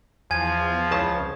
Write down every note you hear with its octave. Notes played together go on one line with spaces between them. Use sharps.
E2 F3 G#5 G#6
C#2 C#3 A5